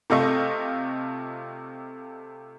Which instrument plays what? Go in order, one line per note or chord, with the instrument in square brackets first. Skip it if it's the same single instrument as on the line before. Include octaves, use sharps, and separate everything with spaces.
[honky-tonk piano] C3 A3 F4 D#5 C#6